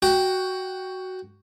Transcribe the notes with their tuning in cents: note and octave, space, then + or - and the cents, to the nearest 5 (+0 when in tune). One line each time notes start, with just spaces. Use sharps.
F#4 +10 G5 +0